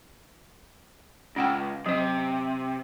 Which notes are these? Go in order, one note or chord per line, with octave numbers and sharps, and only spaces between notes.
C#2 C#4 F#5 G5
C3 F#3 D#5